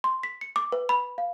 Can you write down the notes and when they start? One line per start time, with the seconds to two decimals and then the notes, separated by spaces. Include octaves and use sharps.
0.04 C6
0.23 B6
0.41 C#7
0.56 D6
0.72 B4
0.89 B5
1.18 F5